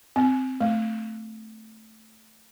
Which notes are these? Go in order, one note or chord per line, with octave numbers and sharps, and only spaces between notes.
C4
A3